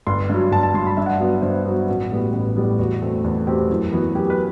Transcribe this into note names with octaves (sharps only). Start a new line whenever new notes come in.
G1 C6
G2 F#3
G1 A5
A5
G2 F#3 C6
B5
G2 E5
F#5
E5
F#3 B3
G2 C5
F#3 B3 F#4
A1 F#4
A2 G3 B3
A1
A2 G3 B3
E2 F#4
B2 A3 C4
E2 A4
B2 A3 C4 G4
F#2 E4
E3 B3 F#4
F#2 G4
B4